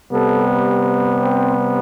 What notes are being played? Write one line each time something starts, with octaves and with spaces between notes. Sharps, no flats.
C3 G3 B3 A4
C4